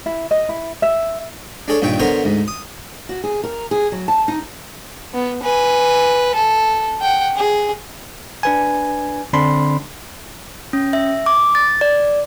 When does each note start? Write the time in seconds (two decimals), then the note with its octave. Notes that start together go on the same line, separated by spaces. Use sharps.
0.06 E4
0.31 D#5
0.49 E4
0.82 E5
1.68 D4 G#4 A4 C#5
1.82 G2 A#2 D#3 C#5 G5
1.99 D3 B3 A#4 C5 C#5
2.24 D2 G#2
2.48 D#6
3.09 F#4
3.24 G#4
3.44 A#4
3.71 G#4
3.92 F#3
4.08 A5
4.28 D#4
5.14 B3
5.42 B4 G#5
6.35 A4
7.01 F#5 G5
7.36 G#4
8.43 D4 B4 G#5
9.33 D3 C4 D4 B5 C6
10.73 C#4
10.93 E5
11.26 D6
11.55 A6
11.81 D5